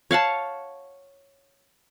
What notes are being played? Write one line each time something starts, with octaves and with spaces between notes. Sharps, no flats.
C#5 F5 F#5 A5